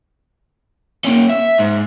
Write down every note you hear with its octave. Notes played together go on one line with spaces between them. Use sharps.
A#3 C#4
E5
G#2